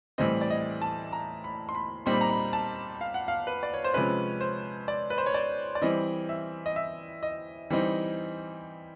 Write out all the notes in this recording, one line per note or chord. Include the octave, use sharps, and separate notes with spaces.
A2 E3 G3 C4 D#5
D5
D#5
A5
A#5
B5
C6
B5
A#2 G3 C4 D#4 C6
B5
A#5
B5
A5
F5
F#5
F5
B4
D5
C#5
C5
C3 F3 G#3 C#4 B4
C5
D5
B4
C5
C#5
D5
D5
E3 G3 C4 D#5
E5
D#5
E5
D#5
E3 G3 C4 D#4